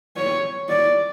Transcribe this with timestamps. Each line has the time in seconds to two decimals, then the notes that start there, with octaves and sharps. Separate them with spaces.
0.17 C#5
0.69 D5